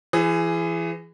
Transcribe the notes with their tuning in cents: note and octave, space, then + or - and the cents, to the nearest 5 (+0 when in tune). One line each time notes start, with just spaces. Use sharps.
E3 +30 G#4 +0